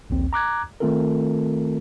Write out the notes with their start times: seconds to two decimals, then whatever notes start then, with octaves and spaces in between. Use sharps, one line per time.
0.10 A#1 D#2 C4
0.33 A#5 D6 F#6 G#6
0.80 D#3 A3 C4 F4 A4 A#4